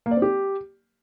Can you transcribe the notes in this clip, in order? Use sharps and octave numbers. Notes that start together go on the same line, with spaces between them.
A#3
D5
C4
G4